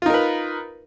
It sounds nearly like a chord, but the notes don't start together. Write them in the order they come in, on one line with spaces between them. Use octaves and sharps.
F4 D#4 A#4 B4